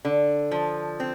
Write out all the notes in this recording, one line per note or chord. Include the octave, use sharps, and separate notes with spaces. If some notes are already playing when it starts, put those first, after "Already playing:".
D3
F3
C4